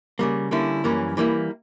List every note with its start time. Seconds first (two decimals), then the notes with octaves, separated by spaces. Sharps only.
0.19 C#3 G3 A#3
0.51 D3 G3 A#3 C#4 E4
0.84 F#2 E3 G3 A#3 C#4
1.17 E3 G3 A#3 E4